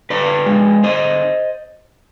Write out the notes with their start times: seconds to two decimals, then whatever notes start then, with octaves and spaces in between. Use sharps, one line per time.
0.10 D3 B4 D5
0.46 G#3
0.83 D3 C5 D#5